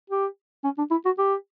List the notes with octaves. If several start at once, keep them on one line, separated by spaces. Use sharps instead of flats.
G4
C#4
D4
E4
F#4
G4